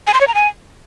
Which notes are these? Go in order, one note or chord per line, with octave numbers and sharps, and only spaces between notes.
G#5
C6
C#5
A#5
G#5